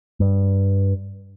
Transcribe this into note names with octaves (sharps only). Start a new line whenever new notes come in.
G2